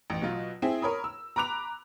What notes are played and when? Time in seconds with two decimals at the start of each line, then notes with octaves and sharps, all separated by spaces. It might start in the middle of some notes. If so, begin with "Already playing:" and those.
0.10 A1
0.22 B2 F#3 F4
0.62 C4 E4 G#4
0.82 A#4 C#5 B5 D#6
1.04 E6
1.36 A#5 B5 D6 F#6 F7